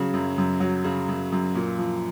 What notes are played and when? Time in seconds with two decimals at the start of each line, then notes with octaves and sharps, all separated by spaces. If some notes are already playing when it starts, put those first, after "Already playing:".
Already playing: C#3 F#3
0.14 F#2
0.38 F#2
0.60 F#3
0.84 C#3
1.09 F#2
1.32 F#2
1.55 A#2
1.79 F3